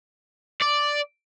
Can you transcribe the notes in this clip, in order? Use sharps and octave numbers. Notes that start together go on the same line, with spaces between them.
D5